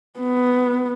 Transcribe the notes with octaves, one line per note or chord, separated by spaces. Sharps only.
B3